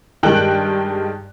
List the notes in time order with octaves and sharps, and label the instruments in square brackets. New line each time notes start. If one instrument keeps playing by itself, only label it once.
[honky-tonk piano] G2 D#3 G#3 G5 F#6 F#7